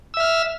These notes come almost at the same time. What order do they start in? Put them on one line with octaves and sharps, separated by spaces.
E6 E5 F6